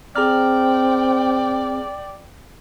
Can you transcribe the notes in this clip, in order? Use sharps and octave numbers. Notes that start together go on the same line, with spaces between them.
C4 G#4 D5 G5 A#5 F6